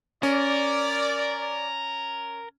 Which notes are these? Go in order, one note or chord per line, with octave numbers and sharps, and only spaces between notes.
C#4 A#4 D5